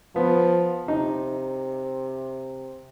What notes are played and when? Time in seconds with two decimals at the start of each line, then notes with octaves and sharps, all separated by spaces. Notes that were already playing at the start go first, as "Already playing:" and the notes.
0.16 F3 B3
0.88 C3 D#4